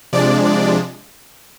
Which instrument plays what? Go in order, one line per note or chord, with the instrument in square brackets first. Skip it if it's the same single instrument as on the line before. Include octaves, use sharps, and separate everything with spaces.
[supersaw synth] C3 F3 G#3 D4 D5
D5